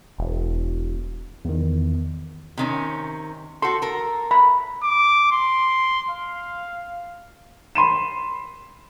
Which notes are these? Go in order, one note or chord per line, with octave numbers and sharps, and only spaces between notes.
E1
E2 D#3
C3 D#3 C#4
F#4 A4 C6
A4 A#4
B5
D6
C6
F5
B5 C6 D#7 E7